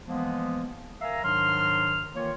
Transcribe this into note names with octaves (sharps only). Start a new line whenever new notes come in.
E3 F3 G#3 A#3 B3
A#4 E5 F5 G#5 A#5
G#2 D#3 F#3 D4 C6 F6
D#3 E3 A#3 F4 C#5